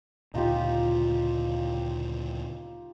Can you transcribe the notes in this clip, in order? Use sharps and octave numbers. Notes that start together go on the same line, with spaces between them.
D2 A#2 C#3 D#4 F4 G4